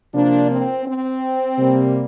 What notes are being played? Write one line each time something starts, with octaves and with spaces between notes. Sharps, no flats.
C3 F3 A#3 D4
C4
C4
C3 G3 A#3